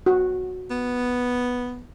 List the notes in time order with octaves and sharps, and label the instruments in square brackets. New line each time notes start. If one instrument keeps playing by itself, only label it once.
[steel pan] F#4
[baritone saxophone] B3